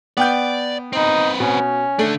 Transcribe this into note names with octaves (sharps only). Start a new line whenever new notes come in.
B3 D5 G5 G6
C4 D#4 B4
B2 C#4
D3 A3 D4